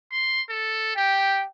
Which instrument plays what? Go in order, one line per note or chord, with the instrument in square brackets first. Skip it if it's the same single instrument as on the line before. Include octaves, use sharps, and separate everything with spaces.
[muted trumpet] C6
A4
[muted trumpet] G4 [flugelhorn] G5